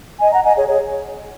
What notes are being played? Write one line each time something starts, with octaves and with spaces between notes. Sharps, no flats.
D#5 G#5
F#5 A#5
D#5 G#5
G#4 C#5
G#4 C#5